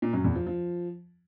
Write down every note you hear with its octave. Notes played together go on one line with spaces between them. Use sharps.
A#2
F#2
E2
F3
F3